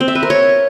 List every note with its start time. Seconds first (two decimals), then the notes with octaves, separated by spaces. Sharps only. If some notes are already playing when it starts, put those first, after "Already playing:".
0.01 C4
0.08 E5
0.15 B4
0.23 A#4
0.30 C#5